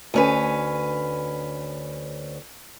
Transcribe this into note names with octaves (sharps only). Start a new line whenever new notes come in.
D2 C#4 B4